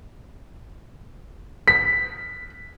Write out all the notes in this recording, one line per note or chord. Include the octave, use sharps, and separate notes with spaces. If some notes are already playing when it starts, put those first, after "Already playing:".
B6